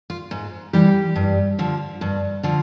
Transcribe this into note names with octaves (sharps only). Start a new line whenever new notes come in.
F4
G#2
E3 G3 G4
G2
D3 F3
G2
D3 F3